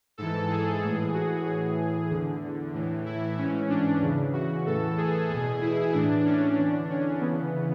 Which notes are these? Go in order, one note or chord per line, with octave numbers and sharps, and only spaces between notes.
G#2 E3 A4
G#4
A2 E3
F#4
A2 E3 G#4
E2 D3
A2 E3
E4
G#2 E3 C#4
D4
E2 C#3 E3
F#4
A2 E3 A4
G#4
E2 G#4
B2
E4
A2 E3 D4
C#4
E2 D3 D4
C#4
E2 C#3 E3 B3